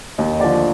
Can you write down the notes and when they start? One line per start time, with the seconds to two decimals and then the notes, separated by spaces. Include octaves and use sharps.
0.18 D#2 D#5
0.40 D3 F3 D5